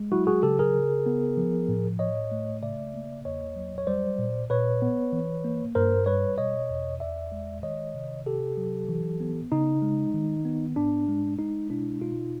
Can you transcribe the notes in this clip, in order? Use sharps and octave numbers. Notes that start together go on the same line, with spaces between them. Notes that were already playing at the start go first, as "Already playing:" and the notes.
Already playing: G#3
F#3 E4 F#4
F#4 G#4
C#3 G4 A4
G#4 A#4
C#3
B3
F3
A2
A2 C#5 D#5
A3
C#3 D5 E5
A#3
E2 C#5 D#5
F#3
C#5
G3 C5 D5
A#2
A#2 B4 C#5
B3
E3
A#3
G2 A#4 C5
G3 B4 C#5
B2 C#5 D#5
E2
E2 D5 E5
G#3
D#3 C#5 D#5
C3
C3 G4 A4
F#3
E3
B3
C#3 D#4
G#3
D#3
B3
G#2 D4
G#3
G#3 D#4
B2 D4 E4
B2 D#4 F4